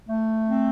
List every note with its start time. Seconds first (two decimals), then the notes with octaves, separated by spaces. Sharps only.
0.09 A3
0.48 C4